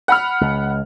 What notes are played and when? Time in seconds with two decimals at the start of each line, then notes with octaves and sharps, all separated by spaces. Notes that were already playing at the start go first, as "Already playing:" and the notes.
0.08 F#5 B5 F6
0.41 C#2